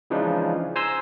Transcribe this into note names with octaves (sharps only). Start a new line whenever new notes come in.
C#3 E3 F3 G#3 D4 D#4
C5 G#5 A#5 C6 E6